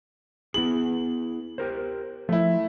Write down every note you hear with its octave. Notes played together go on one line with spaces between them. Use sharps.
B3 E4 G#4 F#7
G4 A#4 C5
F3 A3 E4